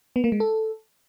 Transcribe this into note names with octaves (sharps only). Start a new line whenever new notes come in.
B3
A#3
G#3
A4